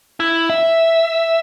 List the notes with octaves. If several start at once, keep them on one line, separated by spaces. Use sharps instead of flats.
E4
E5